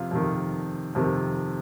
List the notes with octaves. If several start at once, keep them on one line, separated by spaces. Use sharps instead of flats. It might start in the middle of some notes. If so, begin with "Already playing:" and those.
Already playing: F2 C3 F4
F2 C3 D#3
F2 C3 D#3